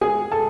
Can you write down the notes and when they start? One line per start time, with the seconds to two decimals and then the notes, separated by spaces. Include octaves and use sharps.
0.01 G#4 G#5
0.32 A4 A5